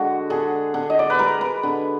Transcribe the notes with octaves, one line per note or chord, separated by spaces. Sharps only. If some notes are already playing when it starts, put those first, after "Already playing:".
Already playing: D3 G#3 F#4
D3 G#4
D3
D#5
D5
B4
G#3 A#4
B4
D3